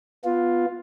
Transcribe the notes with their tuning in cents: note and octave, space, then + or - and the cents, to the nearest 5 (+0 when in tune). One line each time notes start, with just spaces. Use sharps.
B3 +0 F4 +5